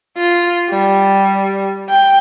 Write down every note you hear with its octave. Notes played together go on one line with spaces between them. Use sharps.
F4
G3
G5